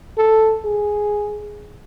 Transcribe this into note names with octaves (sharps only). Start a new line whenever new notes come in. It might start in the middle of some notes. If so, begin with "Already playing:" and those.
A4
G#4